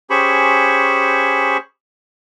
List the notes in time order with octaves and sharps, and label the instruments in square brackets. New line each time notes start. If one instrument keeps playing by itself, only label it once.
[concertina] C#4 G4 G#4 C5 B5 C#6